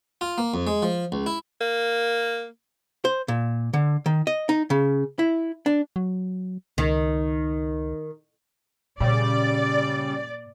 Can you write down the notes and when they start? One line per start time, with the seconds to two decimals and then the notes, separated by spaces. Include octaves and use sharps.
0.21 F4
0.38 A#3
0.54 F2
0.67 G#3
0.82 F3
1.12 C#2
1.26 E4
1.61 A#3
3.05 C5
3.28 A#2
3.73 D3
4.06 D#3
4.27 D#5
4.49 D#4
4.70 C#3
5.19 E4
5.66 D4
5.96 F#3
6.78 C#2 D#3
9.00 A#2 C#3 G3 D5